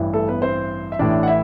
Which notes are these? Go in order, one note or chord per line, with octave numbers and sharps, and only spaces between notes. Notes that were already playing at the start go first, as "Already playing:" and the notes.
Already playing: A1 G2 E3
A3 A4
B3 B4
C4 C5
E5
A1 A2 E3 D4 D5
F#5
E4 E5